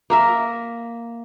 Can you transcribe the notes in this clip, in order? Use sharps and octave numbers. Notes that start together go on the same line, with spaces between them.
A#3 A#4 E5